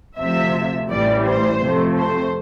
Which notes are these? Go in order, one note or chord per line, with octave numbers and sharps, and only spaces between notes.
D2 C3 F3 E5
A1 A2 E3 G3 D5
C5
F2 C3 F3 A3
C5